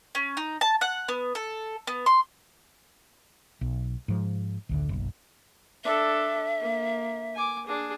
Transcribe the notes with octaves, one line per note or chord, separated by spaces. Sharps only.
C#4
D#4
A5
F#5
B3
A4
B3
C6
B1
G#2 F3
A1 D2 D3
F#1 B1
D4 A4 E5
A#3
G#5 D6
D4 G#4